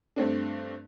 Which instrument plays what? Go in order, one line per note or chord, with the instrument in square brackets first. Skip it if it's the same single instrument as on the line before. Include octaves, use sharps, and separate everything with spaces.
[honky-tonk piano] G2 A3 C4 D4